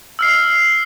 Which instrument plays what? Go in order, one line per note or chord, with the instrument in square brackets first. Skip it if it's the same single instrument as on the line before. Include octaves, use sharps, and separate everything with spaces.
[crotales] E6 F6 C7